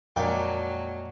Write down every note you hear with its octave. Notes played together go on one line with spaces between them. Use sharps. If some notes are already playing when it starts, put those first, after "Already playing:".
F2 A#2 F#3 G#3 A#3 D4 G5